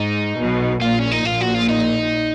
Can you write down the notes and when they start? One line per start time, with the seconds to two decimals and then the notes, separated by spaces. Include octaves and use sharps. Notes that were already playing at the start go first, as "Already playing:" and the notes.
Already playing: G#2 D#4
0.37 B1 B2
0.81 A#1 A#2 F4
0.99 C#4
1.12 D#4
1.25 A#1 A#2 F4
1.41 F#4
1.55 F4
1.69 D#4